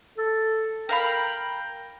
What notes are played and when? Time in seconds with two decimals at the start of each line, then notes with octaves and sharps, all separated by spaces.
0.18 A4
0.89 A#4 F5 G5 B5